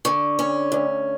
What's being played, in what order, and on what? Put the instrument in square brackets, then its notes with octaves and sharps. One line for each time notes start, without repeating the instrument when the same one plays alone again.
[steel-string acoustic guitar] D3 [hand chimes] C#6
[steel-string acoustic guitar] C#4
D2